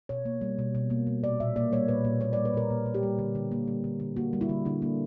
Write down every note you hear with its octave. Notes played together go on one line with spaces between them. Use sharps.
B2 C#5
A#3
G3
B2
B2
A#3
G3
A#2 D5
A#2 E5
A#3 D5
G3 C#5
A#2 B4
A#2
A#3 C#5
G3 D5
B4
A#2 A#4
A#2
A#3
G4
G3
D3
D3
A#3
G3
D3
D3
A#3 F#4
G3
E4
D3
D3 D4
A#3